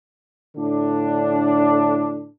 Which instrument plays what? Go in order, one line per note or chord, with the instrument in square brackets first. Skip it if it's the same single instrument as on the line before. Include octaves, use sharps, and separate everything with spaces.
[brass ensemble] A2 D3 D4